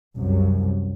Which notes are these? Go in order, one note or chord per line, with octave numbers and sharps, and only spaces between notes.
C2 F#2